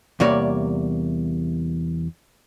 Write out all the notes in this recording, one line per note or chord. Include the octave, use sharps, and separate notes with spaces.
E2 C3 G3 A#3 C#5 D5